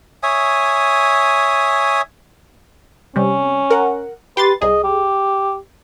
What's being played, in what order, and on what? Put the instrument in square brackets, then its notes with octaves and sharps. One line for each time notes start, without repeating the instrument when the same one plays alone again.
[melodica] C#5 E5 G#5 D#6
[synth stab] C3 G3 [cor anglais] C#4
[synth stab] A#4 F#5
[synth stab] G4 C6 A6 [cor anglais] B4
[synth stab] C2 G#4 [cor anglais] D#5
[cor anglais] G4